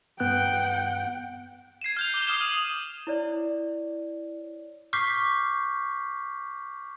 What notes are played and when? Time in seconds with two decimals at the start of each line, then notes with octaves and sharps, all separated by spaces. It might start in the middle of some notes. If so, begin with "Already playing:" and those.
0.20 G2 B3 F#5 G5 F#6
1.82 G#6 C7 D#7 E7
1.97 F6 G6 F7
2.14 D6 G7
2.28 D6 D#6 F6 C7 E7 F7
2.41 F6 D#7 F#7
3.07 E4 C#5 D5
4.93 C#6 D6 F6 G6 B6 C7